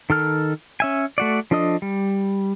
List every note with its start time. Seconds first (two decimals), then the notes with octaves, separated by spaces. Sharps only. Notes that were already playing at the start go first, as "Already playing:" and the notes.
0.10 D#3 A4 F6
0.80 C#4 E5 G#5
1.18 A3 F#4 D5
1.51 F3 D4 A4 D#5 D#6
1.82 G3